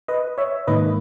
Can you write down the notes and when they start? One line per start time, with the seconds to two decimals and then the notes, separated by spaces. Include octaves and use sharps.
0.08 B4 D#5
0.38 C#5 E5
0.67 G#2 D#3 A#3 D#4 B4 D#5